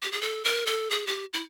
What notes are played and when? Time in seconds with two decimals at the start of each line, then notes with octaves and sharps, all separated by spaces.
0.02 G4
0.12 G#4
0.21 A4
0.45 A#4
0.66 A4
0.91 G#4
1.07 G4
1.34 E4